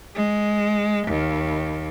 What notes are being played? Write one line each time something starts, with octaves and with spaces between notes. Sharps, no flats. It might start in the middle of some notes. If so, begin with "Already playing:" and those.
G#3
D#2